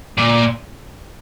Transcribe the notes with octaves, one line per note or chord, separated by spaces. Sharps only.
A#2